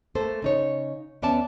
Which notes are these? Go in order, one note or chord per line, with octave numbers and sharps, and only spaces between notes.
A3 A#3 A4 C5
C#3 D#4 C#5
D#2 B3 C#4 D5 E5 A5